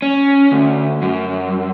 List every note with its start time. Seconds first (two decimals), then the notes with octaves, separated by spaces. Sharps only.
0.02 C#4
0.52 D2
1.02 F#2